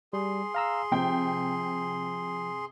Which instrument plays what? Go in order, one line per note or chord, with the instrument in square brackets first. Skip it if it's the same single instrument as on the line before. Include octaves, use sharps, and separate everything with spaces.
[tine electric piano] G3 [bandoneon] G#4 C6
[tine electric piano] F5 A#5 E6
[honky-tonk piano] C3 G5 [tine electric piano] F3